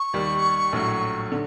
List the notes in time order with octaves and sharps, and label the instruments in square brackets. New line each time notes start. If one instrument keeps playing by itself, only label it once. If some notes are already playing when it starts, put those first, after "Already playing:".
Already playing: [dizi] C#6
[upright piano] D#2 D#3 G3
A#1 A2 F#3
D3